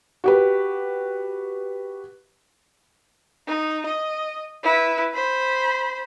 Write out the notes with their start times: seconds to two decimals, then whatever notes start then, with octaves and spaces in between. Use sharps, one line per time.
0.24 F#4 G4 B4
3.47 D#4
3.86 D#5
4.64 E4 B4
5.13 C5 B5